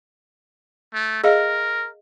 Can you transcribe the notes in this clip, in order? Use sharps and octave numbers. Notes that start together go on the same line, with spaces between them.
A3
G#4 A#4 D#5 F5